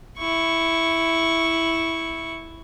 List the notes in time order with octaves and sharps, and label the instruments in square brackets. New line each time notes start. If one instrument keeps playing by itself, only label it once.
[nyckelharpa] E4 C#6